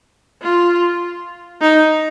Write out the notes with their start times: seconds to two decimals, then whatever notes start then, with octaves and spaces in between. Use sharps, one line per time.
0.42 F4
1.61 D#4